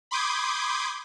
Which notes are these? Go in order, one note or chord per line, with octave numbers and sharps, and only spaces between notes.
B5 C6 D6 D#6 G6 G#6